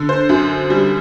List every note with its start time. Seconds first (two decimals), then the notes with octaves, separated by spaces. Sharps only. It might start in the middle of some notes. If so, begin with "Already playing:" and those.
Already playing: D3
0.09 C5
0.29 F#2
0.70 G3